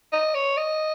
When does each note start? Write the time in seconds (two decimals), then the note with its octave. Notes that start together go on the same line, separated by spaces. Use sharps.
0.12 D#5
0.34 C#5
0.57 D#5